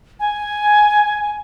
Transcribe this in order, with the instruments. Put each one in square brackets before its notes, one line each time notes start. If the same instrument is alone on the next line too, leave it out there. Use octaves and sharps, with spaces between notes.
[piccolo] G#5